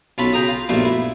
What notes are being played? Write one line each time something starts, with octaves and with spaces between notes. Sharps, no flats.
B1 C#4 F4 A4 B5
C#3 G5 A#5 D#6
F4
B1 G2 A#2 F3 A3
E4